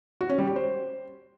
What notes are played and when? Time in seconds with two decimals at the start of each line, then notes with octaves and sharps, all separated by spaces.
0.21 F#4
0.29 C#4
0.38 G3
0.47 G4
0.56 C5